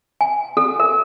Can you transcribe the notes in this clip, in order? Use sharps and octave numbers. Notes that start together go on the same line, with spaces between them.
G#5
A4
A#4